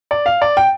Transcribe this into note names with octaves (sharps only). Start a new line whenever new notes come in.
D5
F5
D5
G5